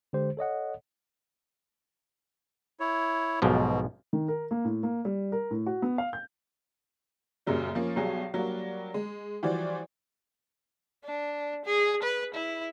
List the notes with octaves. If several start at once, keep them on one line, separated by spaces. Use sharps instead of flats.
D3 G#3 G4 C5
A4 C#5 D#5 F#5
E4 C#5
B1 G#2 B2 F3
D#3
A#4
A#3
A2
A#3
G3
A#4
A2
F#4
B3
F5
G6
F#2 A#2 C#3 F#3 G3
F3 A#3 C#4
B1 F#3 G3 G#4
F#3 G3 A#3 D4 F#4
G#3
E3 F3 G3 F#4 C5 D5
D4
G#4
B4
E4